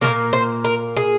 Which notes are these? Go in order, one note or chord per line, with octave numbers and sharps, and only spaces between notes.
F3 A#3 A#4
A#2
C5
A#4
G#4